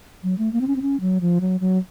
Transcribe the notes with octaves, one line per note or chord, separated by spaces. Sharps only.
F#3
A3
A#3
C4
C#4
C4
C#4
F#3
F3
F#3
F#3